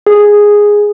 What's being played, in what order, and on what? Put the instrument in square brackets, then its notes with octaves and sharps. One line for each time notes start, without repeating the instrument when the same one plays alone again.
[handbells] G#4